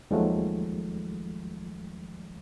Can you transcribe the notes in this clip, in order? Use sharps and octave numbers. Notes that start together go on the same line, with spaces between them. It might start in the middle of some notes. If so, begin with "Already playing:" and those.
D#2 D#3 F3 F#3 G#3 A3